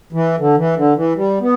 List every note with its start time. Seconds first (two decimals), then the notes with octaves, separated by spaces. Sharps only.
0.13 E3
0.38 D3
0.57 E3
0.76 D3
0.96 E3
1.16 G3
1.41 B3